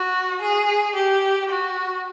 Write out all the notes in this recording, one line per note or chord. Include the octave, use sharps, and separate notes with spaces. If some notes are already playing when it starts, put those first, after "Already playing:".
Already playing: F#4
G#4
G4
F#4